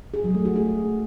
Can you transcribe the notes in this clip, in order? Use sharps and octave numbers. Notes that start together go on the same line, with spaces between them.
G#4
F#3
A3
F#4
G#4